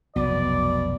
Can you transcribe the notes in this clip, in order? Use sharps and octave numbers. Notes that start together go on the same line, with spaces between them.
F1 B1 B2 D5